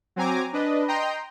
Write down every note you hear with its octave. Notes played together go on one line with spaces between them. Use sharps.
F#3 C4 G#5 A#5 D6
D4 B4 D#5
D#5 G5 A#5 C6 G6